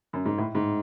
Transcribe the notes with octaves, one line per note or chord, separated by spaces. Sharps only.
F#2
G#2
A2
G#2